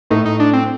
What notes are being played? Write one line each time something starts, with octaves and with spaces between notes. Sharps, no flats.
A2 A3 D#4
D#4
D4
C4